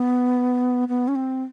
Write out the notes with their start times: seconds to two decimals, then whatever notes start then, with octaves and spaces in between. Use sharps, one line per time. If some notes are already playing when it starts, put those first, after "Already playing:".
Already playing: B3
0.88 B3
1.08 C#4
1.15 C4